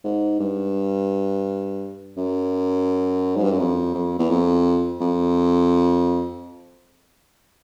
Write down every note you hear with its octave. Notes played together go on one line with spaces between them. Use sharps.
G#2
G2
F#2
G#2
G2
F#2
F2
F2
E2
F2
F2